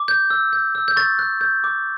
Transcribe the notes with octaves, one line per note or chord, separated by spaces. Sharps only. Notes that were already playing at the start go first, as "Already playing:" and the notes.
Already playing: D6
G6
E6
G6
E6
G6
C#6 A6
F#6
G6
D6